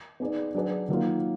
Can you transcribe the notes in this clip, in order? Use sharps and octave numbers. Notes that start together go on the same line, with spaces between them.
B3 D#4 G#4 B4 D5
F#3 D4 G#4 B4 D5
D#3 F#3 A#3 F4